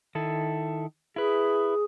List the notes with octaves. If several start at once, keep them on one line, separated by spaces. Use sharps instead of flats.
D#3 E4 A4
E4 G#4 B4